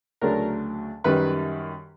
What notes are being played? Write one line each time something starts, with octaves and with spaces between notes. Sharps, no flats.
D2 C#3 F#3 A3 D4 A#4
F#2 D#3 G3 B4